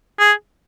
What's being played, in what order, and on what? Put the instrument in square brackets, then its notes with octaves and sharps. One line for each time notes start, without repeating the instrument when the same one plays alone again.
[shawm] G#4